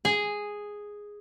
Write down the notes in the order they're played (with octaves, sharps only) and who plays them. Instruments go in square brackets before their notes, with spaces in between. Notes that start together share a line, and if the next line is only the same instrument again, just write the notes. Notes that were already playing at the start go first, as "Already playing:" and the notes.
[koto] G#4